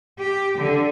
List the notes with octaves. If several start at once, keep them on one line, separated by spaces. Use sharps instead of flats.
G4
D3